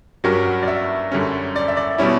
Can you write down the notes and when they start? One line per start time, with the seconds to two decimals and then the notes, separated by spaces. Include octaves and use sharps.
0.24 G2 F#3 C#4 F#4 G4 A#4
0.46 F#5
0.62 D5
0.68 E5
1.12 F#2 D3 G3 C#4
1.56 D5
1.68 E5
1.77 D5
1.98 B2 G3 C#4 E4 C#5